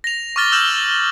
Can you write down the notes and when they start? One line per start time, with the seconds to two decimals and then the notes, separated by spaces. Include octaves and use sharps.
0.04 A#6 F7
0.36 C#6 D6 F6 A6 G7
0.52 E6 F6 G6 E7 F#7